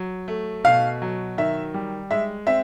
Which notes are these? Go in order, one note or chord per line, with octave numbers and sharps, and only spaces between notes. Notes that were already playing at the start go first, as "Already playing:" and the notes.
Already playing: F#3
A3
B2 F5
F#3
D#3 E5
G3
G#3 E5
C4 E5